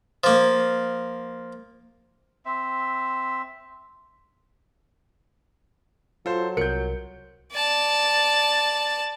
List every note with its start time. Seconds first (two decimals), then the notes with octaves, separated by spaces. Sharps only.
0.24 F3 A#3
2.46 C4 E5
6.26 F#3 F4 A4 C5
6.57 C2 A#4 G6 C#7
7.52 D5 A5